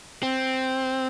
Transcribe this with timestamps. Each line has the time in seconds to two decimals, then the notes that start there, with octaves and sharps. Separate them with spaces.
0.23 C4